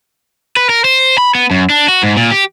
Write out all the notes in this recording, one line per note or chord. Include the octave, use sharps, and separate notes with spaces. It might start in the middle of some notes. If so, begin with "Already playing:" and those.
B4
A#4
C5
B5
B3
F#2
D4
F#4
G#2
A#2
G4